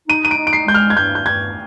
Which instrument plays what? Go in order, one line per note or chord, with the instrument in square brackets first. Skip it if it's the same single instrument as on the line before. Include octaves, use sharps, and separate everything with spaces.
[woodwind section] D#4 [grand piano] D#7
[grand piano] D#7
D7
[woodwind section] D#4
[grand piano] D7
C7
[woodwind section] G#3 [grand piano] G6
[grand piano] F6
G#6
[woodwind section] G2 [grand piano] G6
[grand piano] G6
[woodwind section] G2 [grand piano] G#6